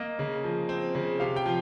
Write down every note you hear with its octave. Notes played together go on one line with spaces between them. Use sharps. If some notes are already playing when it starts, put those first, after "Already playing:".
Already playing: A#3 D#5
C#3
F3
C4
C#3
C3 F5
G5
F3